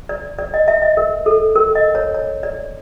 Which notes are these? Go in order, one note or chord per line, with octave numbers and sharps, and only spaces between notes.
D5
D5
D#5
E5
D#5
A#4
A4
A#4
D#5
C#5
C#5
D5